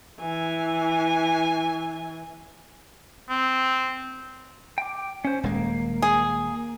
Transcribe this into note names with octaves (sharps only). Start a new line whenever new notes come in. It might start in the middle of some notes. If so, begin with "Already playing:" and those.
E3 G#5
C4
G5 D6
C#4 C5
D#1 G#3 A#3
G#4